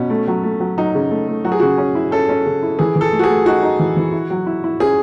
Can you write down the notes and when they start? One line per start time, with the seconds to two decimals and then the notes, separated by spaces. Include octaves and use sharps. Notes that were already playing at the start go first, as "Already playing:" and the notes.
Already playing: B2 C#4
0.10 A3
0.28 F#3
0.43 A3
0.60 F#3
0.78 F#3 D#4
0.95 C#3
1.11 A3
1.28 A3
1.45 F#3 F#4
1.52 G#4
1.60 C#3 F#4
1.78 C#4
1.95 E4
2.11 C#4 A4
2.29 C#4
2.46 C#3
2.63 E4
2.79 E3 G#4
2.96 E3
3.01 A4
3.12 A3
3.19 F#4
3.24 G#4
3.30 A3
3.46 D#4 F#4
3.62 D#4
3.79 E3
3.96 E3
4.12 E4
4.30 F#3
4.46 E4
4.64 E4
4.80 C#4 G#4